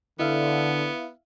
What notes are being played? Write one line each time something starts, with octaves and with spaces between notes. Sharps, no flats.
D3 B3 E4 E5 F5